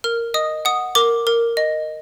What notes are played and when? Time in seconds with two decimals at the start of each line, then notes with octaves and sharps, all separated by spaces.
0.04 A#4 F6
0.34 D#5 D#6
0.65 F#5 D#6
0.95 A#4 D6
1.27 A#4
1.57 D#5